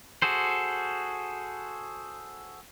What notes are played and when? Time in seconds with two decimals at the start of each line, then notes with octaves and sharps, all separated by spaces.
0.22 F#4 G#4 A4 C5